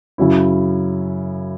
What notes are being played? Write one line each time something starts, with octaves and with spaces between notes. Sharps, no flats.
F#2 C#3 F#3 C#4 E4